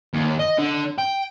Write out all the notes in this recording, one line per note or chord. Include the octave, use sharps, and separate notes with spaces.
D#2
D#5
D3
G5